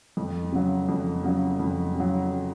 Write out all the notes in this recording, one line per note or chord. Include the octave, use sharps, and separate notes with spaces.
F2
C#3 F#3
F2
C#3 F#3
F2
C#3 F#3